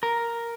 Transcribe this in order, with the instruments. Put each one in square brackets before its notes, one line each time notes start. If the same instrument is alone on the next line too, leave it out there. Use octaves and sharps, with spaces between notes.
[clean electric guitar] A#4